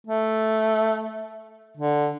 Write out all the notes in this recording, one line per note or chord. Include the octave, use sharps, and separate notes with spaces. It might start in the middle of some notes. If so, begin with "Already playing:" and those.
A3
D3